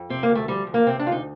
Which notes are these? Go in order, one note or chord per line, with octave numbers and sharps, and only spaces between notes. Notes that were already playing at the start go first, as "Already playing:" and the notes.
Already playing: F2
C3 C4
A#3
D2
A3
F3 G3
D2
A#3
C3 C4
D4
D2 F4
D#4